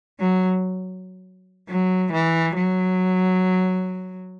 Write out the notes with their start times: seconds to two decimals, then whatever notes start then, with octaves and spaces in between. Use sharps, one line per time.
0.20 F#3
1.68 F#3
2.13 E3
2.56 F#3